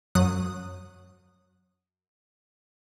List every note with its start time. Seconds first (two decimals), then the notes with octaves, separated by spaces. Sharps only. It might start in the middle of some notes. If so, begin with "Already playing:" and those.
0.15 F#2 F#3 D#6 F#6